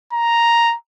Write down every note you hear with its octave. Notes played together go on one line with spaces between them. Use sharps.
A#5